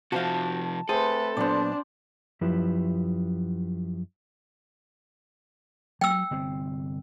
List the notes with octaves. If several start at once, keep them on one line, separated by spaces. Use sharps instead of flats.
C3 F3 F#4 C5 F5 A5
A3 C4 G#4 A4 B4
A#2 F#3 B3 D4 C5 D5
F#2 F3 E4 G4 B4
F#3 G5 E6
G1 C3 C4